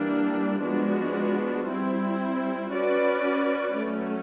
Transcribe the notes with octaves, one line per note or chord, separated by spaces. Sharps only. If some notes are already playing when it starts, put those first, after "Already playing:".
Already playing: E3 G3 A#3 D4
F3 G#3 B3 D4 F#4
G3 C4 E4
C#4 F#4 B4 D5
F#3 A3 C#4